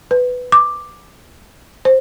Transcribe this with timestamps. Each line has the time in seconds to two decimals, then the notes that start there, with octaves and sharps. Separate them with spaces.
0.11 B4
0.52 D6
1.85 C5